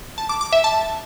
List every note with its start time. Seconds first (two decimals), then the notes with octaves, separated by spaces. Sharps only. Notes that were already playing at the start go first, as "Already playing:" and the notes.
0.18 A5
0.29 D6
0.41 D6
0.52 E5
0.64 A5